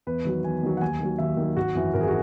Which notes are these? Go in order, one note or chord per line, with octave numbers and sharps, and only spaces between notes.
E2 B4
D#3 F#3
E2 G#5
D#3 F#3
F#5
D#2 G#5
D#3 F#3
D#2 E5
D#3
F#3
G#1 F#4
F#2 E3
G#1 A#4
G#4
F#4